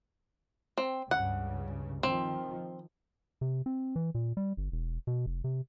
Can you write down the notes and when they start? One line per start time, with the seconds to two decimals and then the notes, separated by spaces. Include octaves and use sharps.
0.78 C4
1.11 C#2 G2 C#3 F#5
2.03 D#3 F3 C4
3.41 C3
3.66 C4
3.96 E3
4.15 A#2
4.37 G3
4.57 G1
4.72 E1
5.07 B2
5.26 F1
5.44 C3